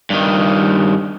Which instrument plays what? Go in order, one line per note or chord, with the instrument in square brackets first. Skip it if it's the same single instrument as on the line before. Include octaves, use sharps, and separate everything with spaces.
[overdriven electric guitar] G2 D#3